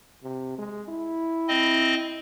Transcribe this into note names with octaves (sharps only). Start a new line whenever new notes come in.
C3
G#3
E4
C4 D#5